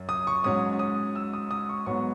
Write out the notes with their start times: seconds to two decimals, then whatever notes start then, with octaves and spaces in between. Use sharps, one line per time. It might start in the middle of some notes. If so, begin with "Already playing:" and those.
Already playing: F#2
0.09 D#6
0.27 C#6
0.44 G#2 F#3 C#4 D#6
0.79 D#6
1.15 E6
1.33 D#6
1.51 D#6
1.69 C#6
1.86 G#2 F#3 B3 C#6